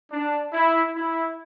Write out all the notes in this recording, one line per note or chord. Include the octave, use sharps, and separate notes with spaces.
D4
E4
E4